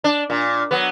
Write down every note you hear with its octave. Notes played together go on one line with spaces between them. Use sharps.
D4
A#2
F#3 B3